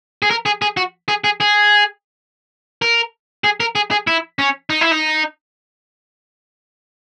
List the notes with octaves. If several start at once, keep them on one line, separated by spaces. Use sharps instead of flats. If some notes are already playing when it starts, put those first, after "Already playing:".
G#4
A#4
G#4
G#4
F#4
G#4
G#4
G#4
A#4
G#4
A#4
G#4
G#4
E4
C#4
D#4
E4
D#4